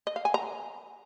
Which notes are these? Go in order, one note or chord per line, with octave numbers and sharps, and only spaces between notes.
D#5
F5
G#5
A#5